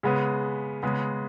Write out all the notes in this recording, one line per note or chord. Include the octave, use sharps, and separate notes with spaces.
C#3 G#3 B3
C#3 G#3 B3